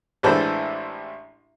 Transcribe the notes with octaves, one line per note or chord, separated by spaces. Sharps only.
A1 E3 G#3 D4 A4 C5